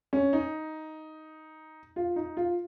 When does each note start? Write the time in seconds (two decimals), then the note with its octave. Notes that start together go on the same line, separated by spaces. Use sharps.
0.13 C#4
0.33 D#4
1.96 F4
2.16 D#4
2.37 F4